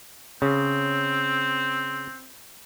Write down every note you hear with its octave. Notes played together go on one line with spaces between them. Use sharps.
C#3 C4